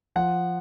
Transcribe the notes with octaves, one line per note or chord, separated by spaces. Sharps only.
F3 F#5